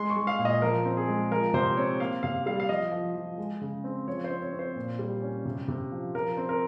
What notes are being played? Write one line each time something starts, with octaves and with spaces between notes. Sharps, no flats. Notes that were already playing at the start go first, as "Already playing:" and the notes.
Already playing: G#3 C6
C#6
G#3
F5
A#2
D#5
F3 A#4
C4
G#4
G#3
F3 A#4
C3 C5
C4 C#5
A#3 F5
C3 F5
G3 F5
F5
F3 D#5
F3
F3
G#3
C#3
C4
F3 C#5
C5
C4
C#5
C4
C5
A#2
G3
C#4
C3
C3
F3
F3 A#4
C4
A#4